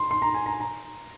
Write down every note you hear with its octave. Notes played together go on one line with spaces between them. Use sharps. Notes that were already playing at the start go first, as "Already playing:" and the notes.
Already playing: C6
C6
A#5
G#5
A#5
A#5